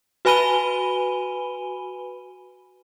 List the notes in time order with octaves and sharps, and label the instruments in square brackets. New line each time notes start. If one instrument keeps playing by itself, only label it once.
[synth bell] F#4 B4 G#5 B5 D#7 G7